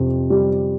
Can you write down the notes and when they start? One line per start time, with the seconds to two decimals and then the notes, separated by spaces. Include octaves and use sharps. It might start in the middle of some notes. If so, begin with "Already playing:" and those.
Already playing: F2 C3
0.30 G3